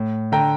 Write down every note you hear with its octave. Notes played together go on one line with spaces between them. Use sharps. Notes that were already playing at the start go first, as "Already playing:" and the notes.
Already playing: A2
D3 G5 A#5